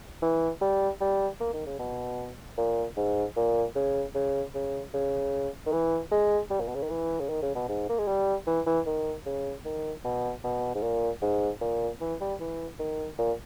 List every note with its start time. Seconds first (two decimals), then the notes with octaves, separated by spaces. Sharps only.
0.22 E3
0.61 G3
1.00 G3
1.40 A#3
1.53 D#3
1.66 C#3
1.79 B2
2.58 A#2
2.97 G#2
3.36 A#2
3.76 C#3
4.15 C#3
4.54 C#3
4.94 C#3
5.66 D#3
5.72 E3
6.12 G#3
6.50 G3
6.60 A#2
6.68 B2
6.75 C#3
6.83 D#3
6.90 E3
7.20 C#3
7.29 D#3
7.42 C#3
7.55 B2
7.69 G#2
7.89 A#3
7.99 G#3
8.07 G3
8.47 E3
8.66 E3
8.86 D#3
9.26 C#3
9.65 D#3
10.04 B2
10.44 B2
10.75 G#2
10.83 A#2
11.22 G#2
11.61 A#2
12.01 E3
12.20 G3
12.40 E3
12.79 D#3
13.18 A#2